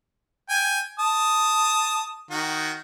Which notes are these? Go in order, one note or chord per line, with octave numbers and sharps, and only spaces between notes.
G5 G#5
A5 D#6
D#3 F#4